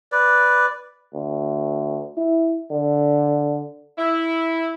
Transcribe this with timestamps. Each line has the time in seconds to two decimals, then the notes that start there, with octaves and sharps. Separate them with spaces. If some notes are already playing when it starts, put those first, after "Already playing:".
0.12 B4 D5
1.14 D2
2.17 E4
2.71 D3
3.98 E4